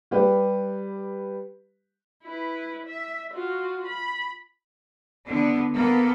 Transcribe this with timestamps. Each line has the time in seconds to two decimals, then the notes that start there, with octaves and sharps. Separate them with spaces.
0.11 G3 G4 B4
2.24 E4 B4
2.86 E5
3.33 F4 F#4
3.86 B5
5.26 D3 B3
5.75 A#3 B3 A4